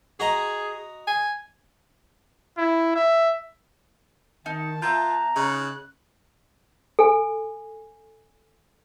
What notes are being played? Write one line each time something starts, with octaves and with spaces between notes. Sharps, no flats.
F#4 G#4 D#5 A#5
G#5
E4
E5
D#3 D#4 A5
B3 F4 E5 A#5 G6
C#3 D#4 F#6
A4 G#5